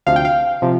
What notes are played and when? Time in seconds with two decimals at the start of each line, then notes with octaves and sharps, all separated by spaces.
0.07 D2 C3 F3 F5
0.16 G5
0.25 F5
0.62 C3 F3